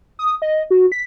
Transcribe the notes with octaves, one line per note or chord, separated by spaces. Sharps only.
D#6
D#5
F#4
B6